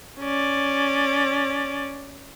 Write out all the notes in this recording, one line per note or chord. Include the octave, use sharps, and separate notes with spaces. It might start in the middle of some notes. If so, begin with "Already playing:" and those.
C#4 D5